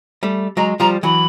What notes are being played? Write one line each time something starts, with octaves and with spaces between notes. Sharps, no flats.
G3 A3
F#3 G#3 A#5
F3 G3 A#5
E3 F#3 B5